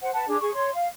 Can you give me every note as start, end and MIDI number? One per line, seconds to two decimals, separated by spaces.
0.02 0.13 72
0.02 0.13 78
0.13 0.25 71
0.13 0.25 78
0.13 0.25 81
0.28 0.36 62
0.28 0.36 68
0.41 0.54 68
0.41 0.54 85
0.54 0.72 73
0.54 0.72 84
0.74 0.87 77